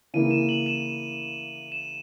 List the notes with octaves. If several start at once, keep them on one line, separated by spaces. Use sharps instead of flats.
C#3 E3 A#3 E4 D#7
E7
F#7
E7
E7